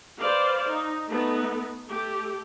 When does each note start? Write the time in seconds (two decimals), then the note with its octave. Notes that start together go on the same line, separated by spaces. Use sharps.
0.19 B4 C5 D5 F5
0.68 D#4
1.08 A3 B3 D#4
1.90 A3 G4